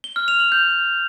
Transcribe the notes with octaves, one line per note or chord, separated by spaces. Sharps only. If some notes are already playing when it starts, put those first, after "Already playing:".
G7
F6
F7
F#7
G6